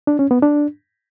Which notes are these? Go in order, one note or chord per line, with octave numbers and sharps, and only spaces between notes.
D4
C#4
B3
D4